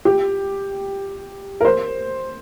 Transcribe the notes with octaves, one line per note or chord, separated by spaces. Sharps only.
G4
A#4
C5